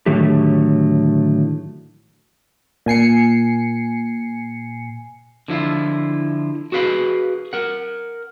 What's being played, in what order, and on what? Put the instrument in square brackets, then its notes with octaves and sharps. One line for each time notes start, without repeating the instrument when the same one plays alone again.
[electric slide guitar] A2 D3 D#3 F#3 A3 G4
[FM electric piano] A#2 G#5 C7 C#7
[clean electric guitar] D3 F3 E4 F4
F#4 G#4 B4 F5 B5
A#4 F#5